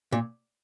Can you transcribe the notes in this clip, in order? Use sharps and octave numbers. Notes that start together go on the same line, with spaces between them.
A#2